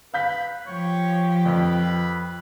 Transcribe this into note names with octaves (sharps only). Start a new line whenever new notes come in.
B4 F5 G6 B6
F3 G4 C#5
F2 B4